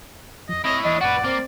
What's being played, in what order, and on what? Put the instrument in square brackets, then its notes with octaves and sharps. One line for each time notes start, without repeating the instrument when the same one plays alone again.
[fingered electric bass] F2 F3 [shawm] D#5
[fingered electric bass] C4 [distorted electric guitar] E4 C#5 [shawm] D#5
[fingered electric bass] D#2 E3 [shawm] D4 [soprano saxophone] D#5
[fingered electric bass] C2 F2 A2 [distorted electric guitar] F#4 B4 [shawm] D5 [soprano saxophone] F#5
[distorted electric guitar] A#3 [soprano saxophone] C4